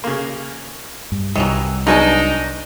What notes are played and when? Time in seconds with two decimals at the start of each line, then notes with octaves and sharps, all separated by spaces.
0.04 C#3 A#3
1.12 G2
1.35 C2 D#3 E3 F#3 G3 D#4
1.87 F#3 G#3 B3 D4 D#4 A#4 G#5 A5